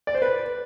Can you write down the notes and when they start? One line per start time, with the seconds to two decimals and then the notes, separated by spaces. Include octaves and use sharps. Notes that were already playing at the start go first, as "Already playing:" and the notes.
0.07 D5
0.15 C5
0.22 B4